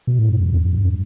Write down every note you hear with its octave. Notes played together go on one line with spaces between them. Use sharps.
B2
A2
G2
F2
E2
F2
G2